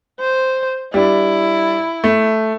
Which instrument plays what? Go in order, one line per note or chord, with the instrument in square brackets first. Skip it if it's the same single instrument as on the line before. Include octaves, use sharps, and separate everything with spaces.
[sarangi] C5
[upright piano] G3 D4 [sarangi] E4
[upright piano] A3